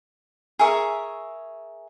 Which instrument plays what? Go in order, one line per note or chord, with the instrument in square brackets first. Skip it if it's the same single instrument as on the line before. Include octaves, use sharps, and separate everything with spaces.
[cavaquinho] G#4 A#4 E5 C#6